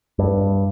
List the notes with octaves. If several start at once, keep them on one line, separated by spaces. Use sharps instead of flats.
G2